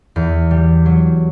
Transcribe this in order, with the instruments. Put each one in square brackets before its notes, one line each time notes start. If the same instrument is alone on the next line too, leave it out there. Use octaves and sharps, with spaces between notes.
[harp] E2
G3
F#3